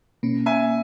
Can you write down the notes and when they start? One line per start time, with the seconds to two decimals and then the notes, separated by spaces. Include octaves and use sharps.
0.23 B2 A#3 C#4
0.46 E5 G#5